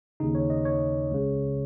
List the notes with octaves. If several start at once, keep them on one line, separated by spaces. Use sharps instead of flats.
D#2 C#3 D#4
C#5
D#5
C#5
C#2 C#3